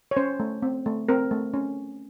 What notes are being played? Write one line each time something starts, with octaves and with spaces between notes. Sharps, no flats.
C#5
C#4 C5
A3
C4
A3
C4 A#4
A3
C#4